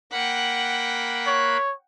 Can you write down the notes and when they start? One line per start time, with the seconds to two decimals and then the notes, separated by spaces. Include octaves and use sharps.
0.12 A#3 F#5 G5 B5 F#6
1.27 C#5